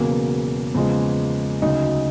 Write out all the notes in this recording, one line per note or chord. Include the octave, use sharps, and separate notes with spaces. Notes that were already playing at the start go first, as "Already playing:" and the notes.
Already playing: E1 E2 C#3 F#3 A#3
E2 C#3 F3 G#3
D2 C#3 F#3 D#4